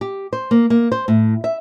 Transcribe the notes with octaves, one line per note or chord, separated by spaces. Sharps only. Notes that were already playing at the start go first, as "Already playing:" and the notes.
G4
C5
A#3
A#3
C5
A2
E5